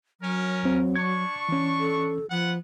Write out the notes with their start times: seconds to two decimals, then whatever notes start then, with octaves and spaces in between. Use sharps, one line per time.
0.21 F#3 C#4 A#4
0.63 E2 C4
0.96 D4 C#6 G#6
1.49 E3 C#4
1.80 A4
2.31 F3 B3 F#5